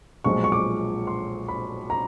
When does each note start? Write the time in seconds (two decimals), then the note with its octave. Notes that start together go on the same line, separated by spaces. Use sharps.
0.24 B1 A#2 F3 G#3 C#6
0.44 C#6
0.52 D6
1.07 C6
1.48 B5
1.90 A#5